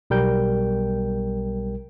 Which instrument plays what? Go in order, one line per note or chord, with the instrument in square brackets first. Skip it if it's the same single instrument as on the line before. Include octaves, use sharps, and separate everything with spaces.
[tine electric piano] B1 G3 A#4 G5 G6